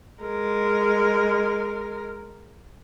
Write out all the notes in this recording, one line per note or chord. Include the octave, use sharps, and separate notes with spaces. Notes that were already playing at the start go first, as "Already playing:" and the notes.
G#3 A#4